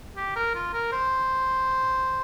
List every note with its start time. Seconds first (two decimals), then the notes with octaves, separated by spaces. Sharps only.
0.17 G4
0.36 A#4
0.55 F4
0.73 A#4
0.92 C5